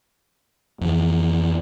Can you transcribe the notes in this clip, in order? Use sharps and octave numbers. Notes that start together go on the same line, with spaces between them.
F2 E3